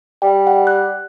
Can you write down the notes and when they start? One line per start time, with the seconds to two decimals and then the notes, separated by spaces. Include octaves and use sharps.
0.22 G3 G5
0.47 F#5
0.67 F#6